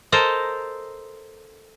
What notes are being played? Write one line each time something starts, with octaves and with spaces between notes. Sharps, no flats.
A4 A#4 C5 D#5 A#5